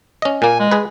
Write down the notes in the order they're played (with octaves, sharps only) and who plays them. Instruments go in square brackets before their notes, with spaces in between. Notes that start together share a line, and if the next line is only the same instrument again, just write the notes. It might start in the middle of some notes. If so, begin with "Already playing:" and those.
[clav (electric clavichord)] C#4 D#5
[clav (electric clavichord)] A#2 A#3 [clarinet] G#5
[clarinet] G#3
[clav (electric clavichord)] G#4 B4